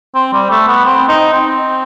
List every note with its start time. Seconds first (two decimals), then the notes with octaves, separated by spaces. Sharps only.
0.15 C4
0.33 G3
0.51 A3
0.67 B3
0.85 C4
1.09 D#4
1.33 C4